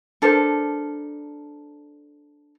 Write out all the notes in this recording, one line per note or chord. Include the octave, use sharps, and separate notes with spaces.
D4 A4 A#4 C5